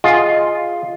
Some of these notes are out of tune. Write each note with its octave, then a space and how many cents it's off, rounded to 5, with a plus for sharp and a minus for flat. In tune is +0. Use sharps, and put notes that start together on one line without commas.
F4 +0 G#4 +0 D#5 +0